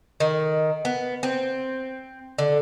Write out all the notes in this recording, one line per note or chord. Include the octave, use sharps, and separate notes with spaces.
D#3
B3
C4
D3